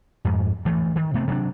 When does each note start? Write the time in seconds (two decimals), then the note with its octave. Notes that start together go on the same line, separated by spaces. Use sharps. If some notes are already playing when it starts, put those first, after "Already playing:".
0.25 F2 G#2
0.65 D2 E3 A3
0.96 D#3
1.14 C3 A3 B3 C4
1.28 C3 F#3 D4